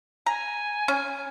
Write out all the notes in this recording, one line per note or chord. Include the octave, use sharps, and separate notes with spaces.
G#5 A#5
C#4